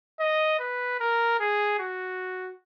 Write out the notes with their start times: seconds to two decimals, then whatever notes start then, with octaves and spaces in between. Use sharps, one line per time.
0.20 D#5
0.60 B4
1.00 A#4
1.40 G#4
1.79 F#4